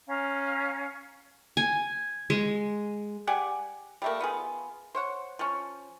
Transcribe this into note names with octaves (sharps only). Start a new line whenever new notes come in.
C#4 F5 A#5
G#5
G#3
G4 D5 F#5 G#5
G3 A3 A#3
B3 F4 G#4
C5 C#5 F#5
F3 C#4